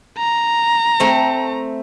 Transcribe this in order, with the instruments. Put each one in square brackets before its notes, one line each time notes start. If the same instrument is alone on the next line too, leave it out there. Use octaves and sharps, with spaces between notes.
[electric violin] A#5
[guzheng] A3 C4